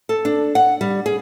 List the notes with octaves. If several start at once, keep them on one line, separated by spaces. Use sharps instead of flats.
A4
D4
F#5
G3
G#4